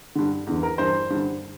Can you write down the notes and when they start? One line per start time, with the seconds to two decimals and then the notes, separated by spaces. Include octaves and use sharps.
0.15 G2 D3
0.47 E2 D3
0.63 A#4
0.78 G2 E3 C5
1.10 G2 D3